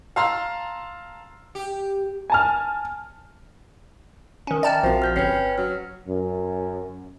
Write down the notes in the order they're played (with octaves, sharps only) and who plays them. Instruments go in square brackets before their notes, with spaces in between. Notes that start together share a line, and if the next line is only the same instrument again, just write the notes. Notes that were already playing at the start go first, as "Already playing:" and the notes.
[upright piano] F5 A5 A#5 C6 E6 F6
[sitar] G4
[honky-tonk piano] G#5 A5 F6
[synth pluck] D#3 C#4
[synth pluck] D5 A5 F6 [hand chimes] E5 G5 A#5
[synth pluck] A#1 [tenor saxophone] F3 [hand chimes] C4 F#4
[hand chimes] F6 G6 B6
[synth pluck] G1 [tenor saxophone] C#4 [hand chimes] B4 G5 C7
[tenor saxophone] F#3 [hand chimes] F6
[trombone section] F#2